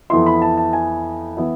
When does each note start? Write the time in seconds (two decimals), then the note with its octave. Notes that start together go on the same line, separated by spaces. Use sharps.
0.10 F2 E3 B3 E4 C6
0.26 B5
0.42 A5
0.57 A5
0.73 G#5
1.37 E3 B3 E4